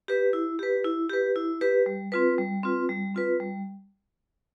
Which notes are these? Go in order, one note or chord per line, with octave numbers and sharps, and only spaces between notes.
G4 B4
E4
G4 B4
E4
G4 B4
E4
G4 B4
G3
C4 F4 B4
G3
C4 F4 B4
G3
C4 F4 B4
G3